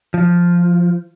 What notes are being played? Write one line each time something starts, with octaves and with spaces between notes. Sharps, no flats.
F3